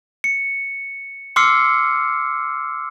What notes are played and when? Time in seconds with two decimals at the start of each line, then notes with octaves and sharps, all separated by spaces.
0.24 C#7
1.36 C6 D6 E6 F6 C7 C#7